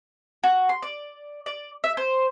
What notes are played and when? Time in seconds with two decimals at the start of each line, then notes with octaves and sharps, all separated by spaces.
0.44 F#4
0.69 C6
0.82 D5
1.46 D5
1.84 E5
1.97 C5